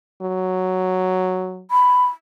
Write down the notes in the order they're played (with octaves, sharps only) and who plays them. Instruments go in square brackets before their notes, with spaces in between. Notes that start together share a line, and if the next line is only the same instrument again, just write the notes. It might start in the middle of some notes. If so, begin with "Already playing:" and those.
[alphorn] F#3
[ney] B5